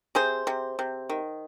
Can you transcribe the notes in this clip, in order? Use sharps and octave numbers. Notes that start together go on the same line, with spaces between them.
C3 G#4 C5
C3
C3
D#3